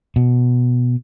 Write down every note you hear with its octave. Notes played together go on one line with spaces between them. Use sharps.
B2